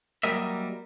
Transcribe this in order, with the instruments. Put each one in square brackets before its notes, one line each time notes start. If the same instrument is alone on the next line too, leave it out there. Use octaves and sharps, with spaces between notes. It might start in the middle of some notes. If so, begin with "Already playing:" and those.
[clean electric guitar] F#3 G3 A#3 A#4 D#5 E5